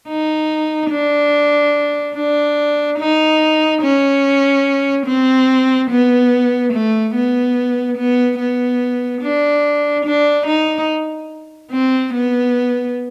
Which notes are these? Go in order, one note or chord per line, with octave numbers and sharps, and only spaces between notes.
D#4
D4
D4
D#4
C#4
C4
B3
A3
B3
B3
B3
D4
D4
D#4
C4
B3